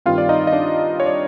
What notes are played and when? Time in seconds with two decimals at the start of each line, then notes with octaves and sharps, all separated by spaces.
0.06 G2 D#3 G3 C4 F4 F5
0.18 D5
0.29 D#4 D#5
0.47 D#5
0.52 D4 D5
1.00 C#5
1.06 D5